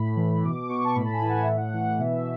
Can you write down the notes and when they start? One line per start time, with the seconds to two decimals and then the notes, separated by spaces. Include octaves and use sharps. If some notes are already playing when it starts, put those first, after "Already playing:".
Already playing: A2 B5
0.16 E3
0.43 B2 D6
0.69 B2 C#6
0.84 A5
0.95 A2 B5
1.05 A5
1.13 G#5
1.21 E3
1.29 F#5
1.43 A2 E5
1.57 F#5
1.73 E3
1.99 B2 E5